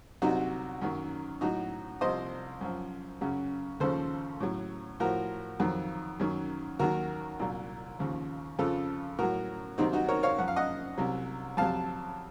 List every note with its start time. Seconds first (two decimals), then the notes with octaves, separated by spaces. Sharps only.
0.22 C2 C3 F#3 D#4 F#4
0.81 F#2 D#3 F#3
1.41 A2 F#3 D#4 F#4
2.01 C2 C3 F3 C5 D#5
2.61 F#2 F3
3.21 F#2 C#3 F#3
3.80 D#2 C#3 F3 A4 C5
4.40 A2 F#3
5.00 A2 F3 F#4 A#4
5.60 F2 D#3 F#3
6.20 F#2 D#3 F#3
6.79 D#2 D#3 F#3 F#4 A#4
7.39 C2 A#2 F#3
7.99 D#2 C#3 F3
8.59 F2 C#3 F3 F4 A4
9.19 A2 F#3 F#4 A#4
9.78 C2 C3 D#3 F#3 C4 D#4
9.93 D#4 F#4
10.08 A#4 C#5
10.23 C#5 F5
10.38 F#2 F3 F#5
10.48 F5
10.56 D#5 F#5
10.98 C2 C3 F#3
11.57 F2 C3 F#3 F5 A5